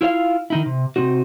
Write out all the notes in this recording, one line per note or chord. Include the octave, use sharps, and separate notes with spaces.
E4 F4 C5 F5
D#3 D#4 E4
C3
C3 D#3 C4 D#4 F#4